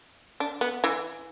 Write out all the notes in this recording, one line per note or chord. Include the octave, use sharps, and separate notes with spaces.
D4
B3
E3